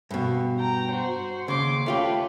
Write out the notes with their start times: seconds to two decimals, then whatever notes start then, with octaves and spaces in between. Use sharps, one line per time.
0.11 G2 B2
0.59 G5 A#5
0.91 F#4 C5
1.48 D#2 C#3 C6 D6
1.86 A3 C#4 F4 G4 B4